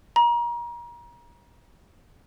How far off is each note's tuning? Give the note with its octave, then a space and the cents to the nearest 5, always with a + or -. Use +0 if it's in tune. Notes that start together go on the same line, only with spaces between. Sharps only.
A#5 +30